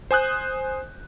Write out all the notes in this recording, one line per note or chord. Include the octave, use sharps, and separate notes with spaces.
C5 G#5 D#6 F#6 G6